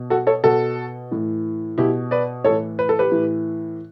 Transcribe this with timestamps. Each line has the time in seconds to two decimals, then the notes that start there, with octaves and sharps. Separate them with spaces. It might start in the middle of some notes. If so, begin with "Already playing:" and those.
Already playing: B2
0.10 F#4 A4
0.27 A4 C#5
0.44 B2 F#4 A4
1.11 A2 E3
1.78 B2 E4 G4
2.11 B4 D5
2.44 A2 E3 A4 C#5
2.79 B4
2.89 A4
2.99 G4 B4
3.12 A2 E3